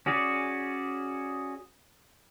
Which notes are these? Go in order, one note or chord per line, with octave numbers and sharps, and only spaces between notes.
C#4 F#4 G#4 D5